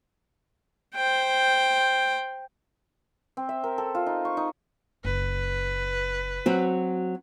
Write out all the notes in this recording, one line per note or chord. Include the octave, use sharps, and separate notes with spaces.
C5 G5
C4
E5
A#4
A4
F4
D#4
C#6
D#4
F#1 B4
F#3 C4 F#4